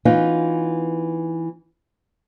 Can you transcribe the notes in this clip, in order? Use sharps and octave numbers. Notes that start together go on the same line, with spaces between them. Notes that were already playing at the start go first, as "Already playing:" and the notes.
E3 B3 C#4 D#4 F4